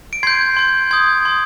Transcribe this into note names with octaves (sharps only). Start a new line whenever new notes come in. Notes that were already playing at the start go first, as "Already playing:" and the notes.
D7
C6 G6 G#6 C7
C6 G6
C6 D#6 G6 G#6
C6 D#6 G6